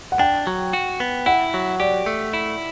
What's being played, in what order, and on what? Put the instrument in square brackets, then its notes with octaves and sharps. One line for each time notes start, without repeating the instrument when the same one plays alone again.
[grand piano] F#5
[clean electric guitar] D4 [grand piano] G5
[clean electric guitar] F#3
F#4
B3
[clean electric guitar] E4 [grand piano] F#5
[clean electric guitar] F#3
[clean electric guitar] G4 [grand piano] D5
[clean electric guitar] A3
E4